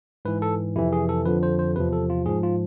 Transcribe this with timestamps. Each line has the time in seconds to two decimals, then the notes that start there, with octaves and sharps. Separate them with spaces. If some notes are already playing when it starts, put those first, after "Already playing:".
0.25 G#2 E3 B4
0.42 A4
0.76 F2 C3 E3 E4
0.92 G#4
1.09 A4
1.26 F2 D3 F3 B4
1.43 C5
1.59 C5
1.76 E2 C3 F3 B4
1.93 A4
2.10 F4
2.26 G#2 F3 G#4
2.43 F4